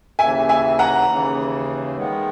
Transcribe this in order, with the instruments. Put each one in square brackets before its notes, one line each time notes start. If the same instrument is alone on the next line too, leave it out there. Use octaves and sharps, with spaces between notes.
[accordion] D#2 C#3 E3 [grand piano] E5 G#5
[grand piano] E5 G#5
F#5 A#5
[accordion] D#2 C#3 E3
D#3 G#3 B3